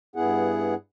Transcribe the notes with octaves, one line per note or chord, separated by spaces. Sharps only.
G2 B3 E4 G#4 F#5